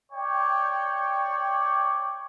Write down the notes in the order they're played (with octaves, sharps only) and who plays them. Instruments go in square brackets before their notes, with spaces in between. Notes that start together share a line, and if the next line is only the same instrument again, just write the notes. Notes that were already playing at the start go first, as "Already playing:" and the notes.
[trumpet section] C#5 D5 G5